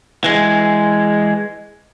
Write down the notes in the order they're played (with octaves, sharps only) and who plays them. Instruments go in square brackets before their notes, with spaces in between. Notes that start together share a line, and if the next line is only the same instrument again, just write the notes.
[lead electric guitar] E3 G#3